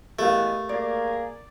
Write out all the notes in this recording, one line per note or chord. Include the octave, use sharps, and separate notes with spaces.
E3 G#3 A3 B3 G4 A#4 F5
A#3 G#4 D5